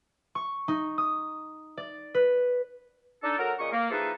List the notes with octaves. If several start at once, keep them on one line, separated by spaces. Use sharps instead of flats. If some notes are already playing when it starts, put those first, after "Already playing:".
C#6
D#4
D#6
D5
B4
D4 D#4 A4
F#3 F#4 A4 A#4
A#2 C#3 D#5 C#6
A#3
E3 F3 D#4 G#4 A4 B4